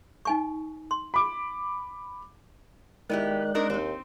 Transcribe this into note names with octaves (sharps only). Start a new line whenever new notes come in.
D#4 G#5 C#6
C6
B5 D6
D#3 G#3 B3 E4 G4 D5 F#6
C4 D4 D#4 A#4
D#2 C4 D#4